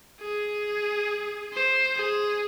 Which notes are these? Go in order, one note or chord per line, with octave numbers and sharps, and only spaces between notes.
G#4
C5
G#4